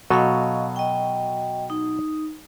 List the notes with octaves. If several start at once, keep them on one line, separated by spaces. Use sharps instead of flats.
B2 F#3 A4 D#5 F5
D#5 G5
D#4